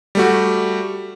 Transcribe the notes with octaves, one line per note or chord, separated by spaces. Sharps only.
G3 A3 F#4